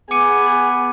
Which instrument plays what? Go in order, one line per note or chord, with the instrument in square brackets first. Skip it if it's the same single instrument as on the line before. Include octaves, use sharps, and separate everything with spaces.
[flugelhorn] B3 [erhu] G#4 [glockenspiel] D6 C#7 D#7